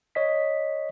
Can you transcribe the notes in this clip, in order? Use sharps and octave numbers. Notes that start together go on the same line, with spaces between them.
C#5 D#5 B6